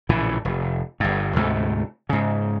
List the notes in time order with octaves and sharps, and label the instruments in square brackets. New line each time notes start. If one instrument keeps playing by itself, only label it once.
[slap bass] A#1 A2 C#3 E3
F1
G1 G2
D2 G#2 C3 A3
G#2 C#3